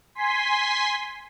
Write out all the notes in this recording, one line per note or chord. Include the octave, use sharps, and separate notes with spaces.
G#5 C6 B6